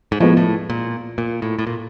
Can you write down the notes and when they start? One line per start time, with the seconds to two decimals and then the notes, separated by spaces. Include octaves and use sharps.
0.12 G#2
0.20 A2 F3 G#3 B3
0.37 A2
0.70 A#2
1.18 A#2
1.42 A2
1.59 A2
1.67 A#2